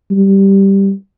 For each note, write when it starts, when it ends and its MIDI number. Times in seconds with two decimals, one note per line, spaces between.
0.11 0.92 55